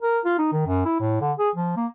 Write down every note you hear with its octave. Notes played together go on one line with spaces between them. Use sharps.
A#4
F4
D#4
D#3
F#2
E4
A2
D3
G#4
F3
A#3